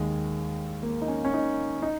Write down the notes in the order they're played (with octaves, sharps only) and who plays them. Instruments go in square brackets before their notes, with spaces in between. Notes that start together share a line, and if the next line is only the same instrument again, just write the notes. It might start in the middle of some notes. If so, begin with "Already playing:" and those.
Already playing: [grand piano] D#2 D#3 G#3
A#3
D#4
C#4
C#4
D#4
D#4